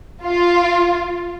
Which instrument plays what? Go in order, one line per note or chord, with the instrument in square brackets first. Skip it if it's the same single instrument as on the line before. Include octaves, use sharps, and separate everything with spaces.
[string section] F4